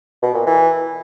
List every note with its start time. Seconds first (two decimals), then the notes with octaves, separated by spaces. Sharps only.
0.23 B2
0.34 A#2
0.46 E3